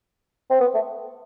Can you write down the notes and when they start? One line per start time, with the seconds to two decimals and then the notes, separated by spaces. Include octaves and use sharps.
0.50 C4
0.60 B3
0.74 A3